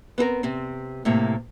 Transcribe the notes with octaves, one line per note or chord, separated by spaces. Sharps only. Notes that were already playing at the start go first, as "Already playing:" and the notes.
B3 C4 A4 A#4
C3 C4
A2 C3 A#3 G4